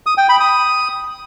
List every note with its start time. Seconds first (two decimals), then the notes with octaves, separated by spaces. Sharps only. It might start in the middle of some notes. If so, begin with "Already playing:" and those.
0.06 D#6
0.18 G5
0.29 B5
0.40 D#6